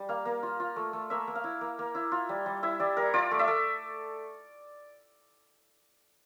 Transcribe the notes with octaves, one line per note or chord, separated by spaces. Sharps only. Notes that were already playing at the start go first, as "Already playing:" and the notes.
Already playing: G3
A#3 F5
A#3
F4
F4
A3
A3
A#3 E5
A#3
F5
E4
A#3
A#3
E4
F4
G3
G3
E4 E5
G3 D5
G3 A#4
F4 D5
A3
E5
A3